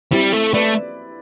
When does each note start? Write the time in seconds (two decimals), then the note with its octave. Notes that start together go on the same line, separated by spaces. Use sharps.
0.12 G3 C4 E4
0.32 A3
0.53 A3 B4 D5